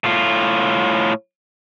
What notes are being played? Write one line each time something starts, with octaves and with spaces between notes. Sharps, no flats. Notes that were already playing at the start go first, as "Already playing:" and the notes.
A2 F4